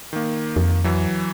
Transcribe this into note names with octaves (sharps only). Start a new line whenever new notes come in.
D#3 A#3
F2
E3 F#3